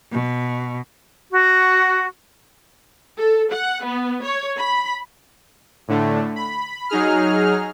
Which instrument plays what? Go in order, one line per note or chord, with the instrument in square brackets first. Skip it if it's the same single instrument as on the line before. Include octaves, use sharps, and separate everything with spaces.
[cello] B2
[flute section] F#4
[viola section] A4
F#5
B3
C#5
B5
[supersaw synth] A2 D3 A3
B5
F#3 D#4 G#4 F6